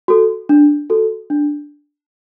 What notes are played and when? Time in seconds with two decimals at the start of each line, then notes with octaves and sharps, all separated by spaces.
0.08 F#4 A4
0.49 D4
0.90 F#4 A4
1.30 D4